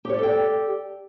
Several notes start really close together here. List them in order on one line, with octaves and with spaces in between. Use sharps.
G4 C#5 D5 A4 G5